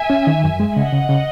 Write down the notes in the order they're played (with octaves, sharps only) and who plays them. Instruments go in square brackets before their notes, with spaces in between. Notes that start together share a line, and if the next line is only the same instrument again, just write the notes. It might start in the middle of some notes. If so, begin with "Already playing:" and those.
Already playing: [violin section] E5 G#5
[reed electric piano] C#4
D#3
F#2
G#3
[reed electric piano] C#3 [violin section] D#5 F#5
[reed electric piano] C#3
C#3